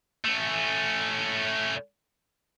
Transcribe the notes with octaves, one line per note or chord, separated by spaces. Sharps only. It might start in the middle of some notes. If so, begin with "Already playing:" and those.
A3 C#4